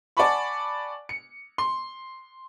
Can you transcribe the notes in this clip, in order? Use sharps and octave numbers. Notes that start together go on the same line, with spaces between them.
D5 F#5 G#5 A5 B5 C#6
C#7
C6